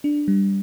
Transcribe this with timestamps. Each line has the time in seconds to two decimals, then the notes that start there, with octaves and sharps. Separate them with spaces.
0.04 D4
0.28 G3